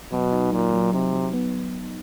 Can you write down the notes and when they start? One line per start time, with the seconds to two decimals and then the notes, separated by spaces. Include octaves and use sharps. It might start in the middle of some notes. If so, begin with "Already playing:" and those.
0.12 B2 F#3
0.32 D#4
0.53 A#2 F#3
0.73 F#3
0.93 C3 D#4
1.14 F#3
1.33 B3